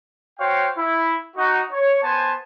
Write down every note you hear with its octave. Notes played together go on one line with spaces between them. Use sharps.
F#4 C5 C#5 F5 G5
E4
D#4 F#4
C#5
B3 C5 G#5 A5